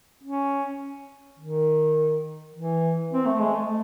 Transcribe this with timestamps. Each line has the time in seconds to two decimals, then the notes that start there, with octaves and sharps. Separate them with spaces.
0.23 C#4
1.39 D#3
2.54 E3
3.13 C4
3.26 A3
3.40 G#3
3.54 A3